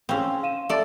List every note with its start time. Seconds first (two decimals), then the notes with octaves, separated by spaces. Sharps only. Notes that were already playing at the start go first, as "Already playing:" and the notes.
0.09 C4 C#4 G#4 F5 E6
0.43 F5 D#7 E7
0.69 A4 D5 E5